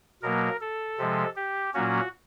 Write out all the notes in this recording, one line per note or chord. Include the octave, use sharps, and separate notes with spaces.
B2 F#3 A#3 A#4
A4
C3 F3 G#3
G4
A#2 F#3 A#3 C#4 F#4